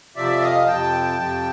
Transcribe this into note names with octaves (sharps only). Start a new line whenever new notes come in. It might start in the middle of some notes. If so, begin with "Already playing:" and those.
F2 C3 F3 D5 E5
D#5 F5
F2 C3 F3 G5 A5
F2 C3 F3